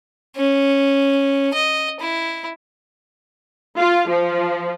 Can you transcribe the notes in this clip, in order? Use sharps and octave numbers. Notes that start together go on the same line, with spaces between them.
C#4
D#5
E4
F4
F3